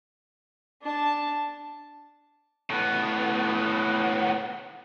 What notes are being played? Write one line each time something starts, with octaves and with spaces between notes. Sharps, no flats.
D4 A5
A2 B3